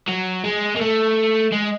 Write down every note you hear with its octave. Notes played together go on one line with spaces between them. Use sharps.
F#3
G#3
A#3
A3
G#3